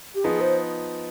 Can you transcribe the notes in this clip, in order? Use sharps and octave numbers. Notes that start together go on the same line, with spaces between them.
G4
F3 B3 D#4 G#4
C5